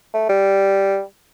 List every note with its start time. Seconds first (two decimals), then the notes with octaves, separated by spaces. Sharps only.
0.14 A3
0.29 G3